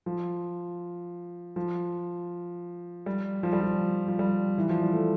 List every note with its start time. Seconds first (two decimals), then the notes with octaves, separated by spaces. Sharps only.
0.06 F3
1.56 F3
3.06 G3
3.43 F3
3.53 G3
3.61 F3
4.08 F3
4.19 G3
4.58 E3
4.69 F3
4.82 G3
4.93 A3